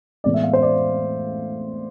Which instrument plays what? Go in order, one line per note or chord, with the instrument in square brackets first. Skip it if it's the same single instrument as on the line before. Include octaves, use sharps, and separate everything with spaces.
[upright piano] A2 E3 G#3 B3 D5
E5
F5
C5
D5